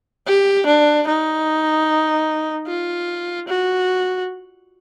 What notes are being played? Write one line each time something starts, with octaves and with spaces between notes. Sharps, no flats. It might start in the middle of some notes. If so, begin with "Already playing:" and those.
G4
D4
D#4
F4
F#4